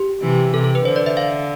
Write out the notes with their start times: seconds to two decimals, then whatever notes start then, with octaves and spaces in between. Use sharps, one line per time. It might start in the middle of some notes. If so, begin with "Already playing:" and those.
Already playing: G4
0.22 C3 E3
0.54 C3 A4
0.64 A4
0.75 B4
0.85 D3 C5
0.96 D5
1.06 E5
1.17 F5